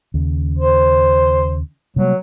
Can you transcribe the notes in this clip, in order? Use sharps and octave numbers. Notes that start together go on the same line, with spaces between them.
D#2 C#3
C5
C3 F#3 G3 A#3